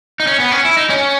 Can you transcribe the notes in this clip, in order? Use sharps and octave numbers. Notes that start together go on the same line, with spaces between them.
D#4
C#4
B3
C#4
E4
D#4
C#4